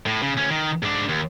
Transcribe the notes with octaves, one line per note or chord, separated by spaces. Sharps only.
A2
C#3
D2 C#4
D#3
G#2 D4
D#2